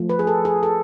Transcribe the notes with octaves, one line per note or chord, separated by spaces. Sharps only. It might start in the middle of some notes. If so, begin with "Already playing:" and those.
Already playing: F3 A3
B4
G#4
A4
G#4
A4